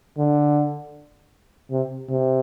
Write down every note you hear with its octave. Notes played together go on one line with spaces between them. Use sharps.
D3
C3
C3